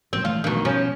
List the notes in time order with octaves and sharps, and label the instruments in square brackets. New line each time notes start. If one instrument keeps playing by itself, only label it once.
[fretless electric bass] A1 A#2 F#3 [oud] C4
[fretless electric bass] E3 A3 [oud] F4
[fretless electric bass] A#1 A3 D4 [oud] B2 D#3
[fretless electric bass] B2 G3 [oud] F3 C#4